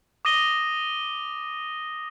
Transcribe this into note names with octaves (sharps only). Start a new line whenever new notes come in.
D6 D#6 A#6 D#7 G7